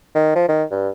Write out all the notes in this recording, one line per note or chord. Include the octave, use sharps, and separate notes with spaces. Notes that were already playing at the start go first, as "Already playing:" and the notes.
D#3
F3
D#3
G2